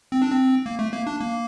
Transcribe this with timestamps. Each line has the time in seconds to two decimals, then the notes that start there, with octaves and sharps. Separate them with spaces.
0.12 C4
0.22 D4
0.32 C4
0.66 A#3
0.79 A3
0.93 A#3
1.07 D4
1.21 A#3